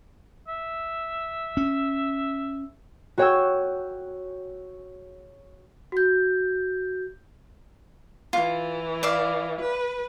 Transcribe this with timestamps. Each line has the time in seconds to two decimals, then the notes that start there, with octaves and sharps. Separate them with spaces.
0.48 E5
1.57 C#4
3.18 F#4 G#4 C#5 G5 G#5 E6
5.92 F#4 G6
8.33 E3 F4
9.03 D5 E5 F5
9.61 B4